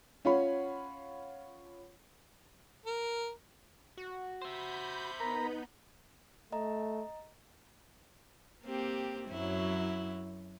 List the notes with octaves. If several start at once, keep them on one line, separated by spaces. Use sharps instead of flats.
C#4 F4 C#5 F#5 B5
A#4
F#4
C5 E5 B5 G6
B3 D#4 A#4 A#5 B5
A3 D#5 A#5
A#3 C4 G4
F#2 F#3 E4